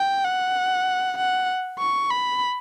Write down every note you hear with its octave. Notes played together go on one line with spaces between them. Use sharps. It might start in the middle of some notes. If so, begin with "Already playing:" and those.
Already playing: G5
F#5
F#5
C#6
B5